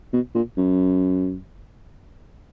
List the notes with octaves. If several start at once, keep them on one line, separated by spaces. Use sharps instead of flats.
B2
A#2
F#2